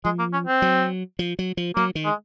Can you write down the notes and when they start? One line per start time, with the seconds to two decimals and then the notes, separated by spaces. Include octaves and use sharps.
0.05 F3 G#3
0.19 A#3
0.33 C#4
0.47 C4
0.62 F#3
1.19 F3
1.39 F#3
1.57 F3
1.76 F#3 A#3
1.95 D#3
2.05 G#3